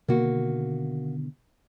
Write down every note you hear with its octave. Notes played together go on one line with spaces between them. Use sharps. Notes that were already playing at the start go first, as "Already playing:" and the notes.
B2 D3 D#3 A#3 F#4